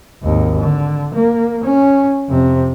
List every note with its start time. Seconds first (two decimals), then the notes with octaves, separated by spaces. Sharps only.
0.23 G#1 D#2
0.61 D3
1.14 A#3
1.64 C#4
2.29 F2 C3